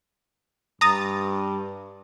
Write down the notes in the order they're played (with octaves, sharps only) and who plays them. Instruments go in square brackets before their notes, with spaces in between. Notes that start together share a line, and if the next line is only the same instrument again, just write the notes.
[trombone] G2 [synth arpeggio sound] A#5 D#6 A6